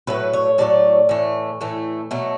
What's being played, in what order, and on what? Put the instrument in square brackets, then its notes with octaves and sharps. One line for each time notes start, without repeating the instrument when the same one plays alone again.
[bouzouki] A2 F#3 A3 B4
C#5
A2 F#3 A3 D5
A2 E3 A3
A2 E3 A3
B2 F#3 A3